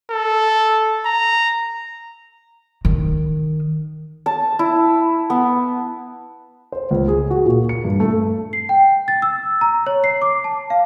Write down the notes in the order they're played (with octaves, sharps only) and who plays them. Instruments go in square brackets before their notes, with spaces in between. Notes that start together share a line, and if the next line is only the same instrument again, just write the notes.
[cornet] A4
A#5
[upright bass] D#3
[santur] A5
E4
B3
[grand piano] C5
C#2
G#4
F#4
A#2
C#7
G2
A3
[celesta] C7
G5
A6
E6
A#5
C#5
C7
D6
A5
F5